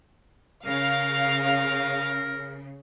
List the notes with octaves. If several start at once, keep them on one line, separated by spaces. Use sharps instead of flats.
C#3 A#4 F5